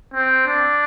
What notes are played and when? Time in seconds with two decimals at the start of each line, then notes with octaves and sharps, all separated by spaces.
0.14 C4
0.47 D4